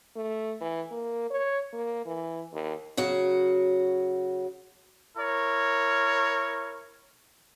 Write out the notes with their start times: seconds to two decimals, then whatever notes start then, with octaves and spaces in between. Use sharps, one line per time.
0.16 A3
0.61 E3
0.91 A#3
1.30 C#5
1.73 A#3
2.06 E3
2.53 D#2
2.97 C#3 F#3 F#4
5.17 E4 A#4 C#5